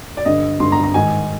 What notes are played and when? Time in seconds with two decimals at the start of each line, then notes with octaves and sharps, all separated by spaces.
0.17 D5
0.25 G2 D3 D#5
0.60 G2 D3 C6
0.72 A#5
0.84 A#5
0.94 G#2 D#3 G#5